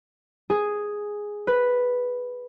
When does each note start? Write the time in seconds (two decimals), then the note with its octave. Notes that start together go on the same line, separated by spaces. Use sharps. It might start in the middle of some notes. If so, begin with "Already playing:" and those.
0.50 G#4
1.47 B4